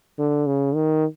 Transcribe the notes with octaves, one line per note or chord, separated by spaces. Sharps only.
D3
C#3
D#3